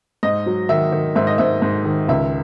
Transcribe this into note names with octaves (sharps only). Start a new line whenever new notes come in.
G#2 D#5
F#3
D#3 E5
D#3
G#2 E5
D#5
G#2 E5
G#2
D#3
C#2 E5